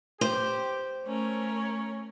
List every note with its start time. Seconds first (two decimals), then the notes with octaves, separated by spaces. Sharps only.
0.21 G4 C5
1.04 A3 C#4 A#4 C#5